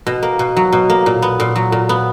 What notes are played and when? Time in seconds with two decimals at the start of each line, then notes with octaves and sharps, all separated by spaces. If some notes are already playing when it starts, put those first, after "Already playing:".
0.07 B2
0.23 A#3
0.39 B2
0.56 F#3
0.72 B2
0.90 A#3
1.06 A#2
1.22 B3
1.40 A#2
1.56 F#3
1.72 A#2
1.89 B3